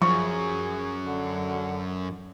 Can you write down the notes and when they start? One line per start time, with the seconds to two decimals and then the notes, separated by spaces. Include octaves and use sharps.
0.02 F#2 F3 G#4 C#6
1.03 D3